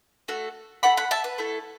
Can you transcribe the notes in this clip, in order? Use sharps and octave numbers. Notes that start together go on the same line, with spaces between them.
A3 F#4 A4
A3 E4 A4 F#5 B5
F#5 B5
E5 A5
B4
A3 E4 A4